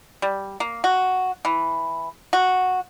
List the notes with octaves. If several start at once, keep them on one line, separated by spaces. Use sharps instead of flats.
G3
A#3
F#4
E3
F#4